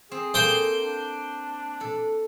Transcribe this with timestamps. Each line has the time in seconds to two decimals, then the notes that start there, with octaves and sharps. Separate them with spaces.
0.11 C4 G#4
0.34 A#3 A4 C5 G5 C6
0.83 D4
1.81 A4